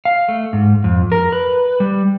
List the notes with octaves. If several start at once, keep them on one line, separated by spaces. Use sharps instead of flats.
F5
A3
G#2
F2
A#4
B4
G3